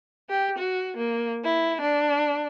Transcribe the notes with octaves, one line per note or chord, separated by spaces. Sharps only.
G4
F#4
A#3
E4
D4